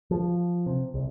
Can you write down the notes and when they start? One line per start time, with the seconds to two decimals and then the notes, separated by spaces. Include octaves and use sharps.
0.11 F3
0.66 C3
0.94 C2